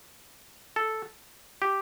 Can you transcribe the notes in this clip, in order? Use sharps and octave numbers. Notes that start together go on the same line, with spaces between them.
A4
G4